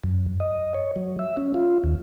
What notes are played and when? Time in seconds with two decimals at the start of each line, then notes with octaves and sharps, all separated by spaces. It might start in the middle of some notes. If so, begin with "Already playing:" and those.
0.04 F#2
0.40 D#5
0.74 C#5
0.96 F#3
1.19 E5
1.37 C#4
1.54 F4
1.84 D#2